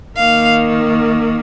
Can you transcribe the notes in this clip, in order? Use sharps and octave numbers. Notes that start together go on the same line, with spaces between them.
D#3 A#3 F5